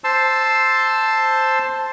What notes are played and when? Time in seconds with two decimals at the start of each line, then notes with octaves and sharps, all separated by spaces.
0.04 C5 A5 C6 E6